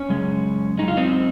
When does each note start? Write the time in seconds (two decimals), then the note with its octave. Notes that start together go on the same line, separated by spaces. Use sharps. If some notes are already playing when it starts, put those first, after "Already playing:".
Already playing: C#4
0.09 F#2 C#3 G#3
0.78 F#2 C#3 G#3 D#4
0.88 F4
0.97 C4 D#4